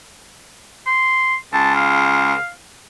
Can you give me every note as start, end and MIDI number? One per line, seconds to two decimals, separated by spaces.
0.87 1.35 84
1.53 2.34 37
1.53 1.72 81
1.76 2.49 77